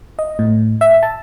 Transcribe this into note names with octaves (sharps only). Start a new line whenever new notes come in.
D#5
A2
E5
A5